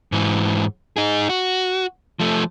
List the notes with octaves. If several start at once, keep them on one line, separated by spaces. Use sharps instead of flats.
G#2 E3
D#4 G#4
F#4
F3 A3